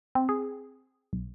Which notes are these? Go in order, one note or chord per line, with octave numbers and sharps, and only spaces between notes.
C4
G#4
B1